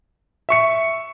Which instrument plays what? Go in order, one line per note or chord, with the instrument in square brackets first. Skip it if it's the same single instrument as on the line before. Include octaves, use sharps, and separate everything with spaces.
[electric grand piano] E5 C#6 C#7